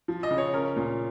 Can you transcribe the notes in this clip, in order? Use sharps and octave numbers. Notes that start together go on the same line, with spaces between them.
F3
D#5
C#3
C#5
C#4 A#4
A#2